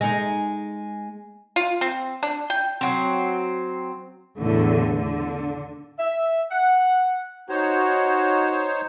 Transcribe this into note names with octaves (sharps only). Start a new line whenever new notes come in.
G#3 D#4
F4
C4
D4
G5
F#3 C4
E2 A2 D3
D3
E5
F#5
D#4 F#4 C5 C#5